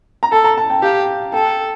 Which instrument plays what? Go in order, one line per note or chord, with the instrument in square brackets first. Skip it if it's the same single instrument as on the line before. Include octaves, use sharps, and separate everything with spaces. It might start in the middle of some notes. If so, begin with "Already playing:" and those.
[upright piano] A#5
[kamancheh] A4 [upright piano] A5
[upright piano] A#5
A5
G5
[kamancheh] G4 [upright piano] F5
[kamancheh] A4 [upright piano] G5